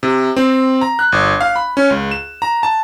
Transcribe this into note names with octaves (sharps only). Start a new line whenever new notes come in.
C3
C4
A#5
F#6
G1
F5
B5
C#4
C#2
E7
A#5
A5